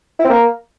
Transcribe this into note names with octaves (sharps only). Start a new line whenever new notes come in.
E4
C4
A#3